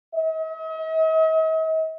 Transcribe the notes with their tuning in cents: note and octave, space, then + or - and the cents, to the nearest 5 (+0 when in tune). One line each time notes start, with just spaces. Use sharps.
D#5 +45